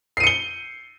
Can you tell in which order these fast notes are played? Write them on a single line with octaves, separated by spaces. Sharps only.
C7 D#7 C#7 G7